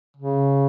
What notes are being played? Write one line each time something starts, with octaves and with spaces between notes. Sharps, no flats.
C#3